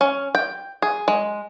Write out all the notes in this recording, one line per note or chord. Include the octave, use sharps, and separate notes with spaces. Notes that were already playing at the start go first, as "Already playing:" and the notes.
C#4
G5
G#4
G#3